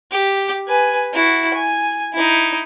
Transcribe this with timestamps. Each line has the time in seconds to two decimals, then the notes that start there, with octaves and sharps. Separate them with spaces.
0.12 G4
0.67 B4 G#5
1.14 E4 F#4
1.54 G#5
2.14 D#4 E4